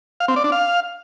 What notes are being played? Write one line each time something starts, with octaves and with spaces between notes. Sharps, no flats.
F5
C4
D5
D4
F5